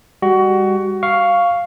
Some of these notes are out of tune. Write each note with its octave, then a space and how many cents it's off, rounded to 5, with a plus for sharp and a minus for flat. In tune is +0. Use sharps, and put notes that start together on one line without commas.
G3 +35 F#4 +20
F5 +0 C#6 +10